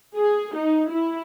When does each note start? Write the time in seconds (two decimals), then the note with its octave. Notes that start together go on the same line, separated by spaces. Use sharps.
0.15 G#4
0.55 D#4
0.90 E4